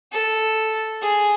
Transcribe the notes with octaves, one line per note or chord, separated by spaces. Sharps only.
A4
G#4